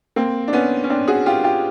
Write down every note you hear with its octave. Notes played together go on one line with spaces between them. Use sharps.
A#3 C4
D4
B3 C#4
C#4
C4 D4
F#4 G#4
F4 G4
F4 G4